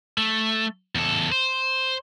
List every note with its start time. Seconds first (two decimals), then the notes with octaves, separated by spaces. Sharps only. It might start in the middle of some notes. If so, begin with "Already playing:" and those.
0.18 A3
0.95 E2 A4
1.32 C5